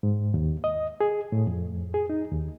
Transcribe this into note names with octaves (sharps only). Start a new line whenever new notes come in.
G#2
D#2
D#5
G#4
A2
F2
G#4
D#4
D#2